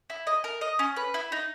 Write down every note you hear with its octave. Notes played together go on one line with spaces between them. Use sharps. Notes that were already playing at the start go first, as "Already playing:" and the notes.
E4
D#5
A#4
D#5
C#4
B4
E4
D#4